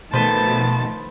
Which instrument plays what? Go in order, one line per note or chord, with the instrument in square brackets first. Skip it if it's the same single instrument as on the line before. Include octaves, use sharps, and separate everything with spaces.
[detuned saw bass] B2 [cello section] D#3 F3 A3 [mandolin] B4 C5 [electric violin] A5